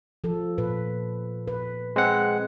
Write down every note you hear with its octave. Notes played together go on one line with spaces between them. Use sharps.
F3 A4
A#2 B4
B4
G#3 C4 F#5